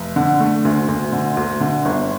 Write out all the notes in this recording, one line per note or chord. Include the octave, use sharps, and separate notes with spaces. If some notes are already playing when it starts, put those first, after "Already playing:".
Already playing: F1
D3
A3
D2
D2
D3
D2
D3
G1